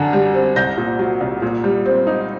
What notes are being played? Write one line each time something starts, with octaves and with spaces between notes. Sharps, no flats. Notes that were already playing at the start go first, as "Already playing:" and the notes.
Already playing: F#2 D3
G3
C4
C2 G6 A#6
A#2
F#3
C2
A#2
G3
C4
D#4